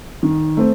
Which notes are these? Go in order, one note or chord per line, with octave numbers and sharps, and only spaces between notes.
D#3
A3 C4